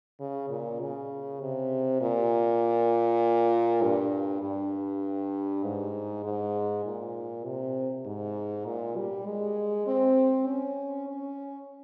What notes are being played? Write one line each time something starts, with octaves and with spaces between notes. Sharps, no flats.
C#3
A#2
C#3
C3
A#2
G2
G2
G#2
G#2
A#2
C3
G#2
A#2
G3
G#3
C4
C#4
C#4